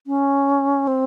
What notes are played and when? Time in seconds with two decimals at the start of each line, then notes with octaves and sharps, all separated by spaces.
0.07 C#4
0.87 C4